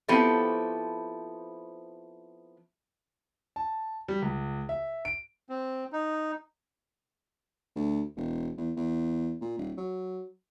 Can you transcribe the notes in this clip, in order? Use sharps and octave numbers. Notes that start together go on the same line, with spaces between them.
F3 B3 C4 E4 G4 A4
A5
G3
C#2
E5
D7
C4
D#4
D2
E1
E2
E2
A#2
D#1
F#3